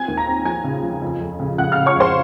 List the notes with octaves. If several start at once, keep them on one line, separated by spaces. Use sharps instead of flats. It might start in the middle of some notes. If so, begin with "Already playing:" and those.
Already playing: C4 G#5 G#6
D#2
A#5 A#6
C4
F3 G#5 G#6
C#3
F3
F2
F2
C#3
C#3 F#5 F#6
F5 F6
C#3
C#5 C#6
F2 C5 C6